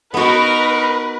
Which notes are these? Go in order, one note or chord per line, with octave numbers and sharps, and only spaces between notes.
B3 D#4 F#4 A#4 B4 B5